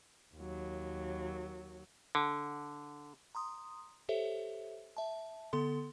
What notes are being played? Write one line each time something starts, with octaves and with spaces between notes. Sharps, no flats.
D#2 F#3
D3
A#5 C6 D#6
G4 A4 C5 C#5 E5
E5 A5
D3 B3 A4 C6